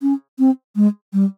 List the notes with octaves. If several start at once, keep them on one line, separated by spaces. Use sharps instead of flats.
C#4
C4
G#3
G3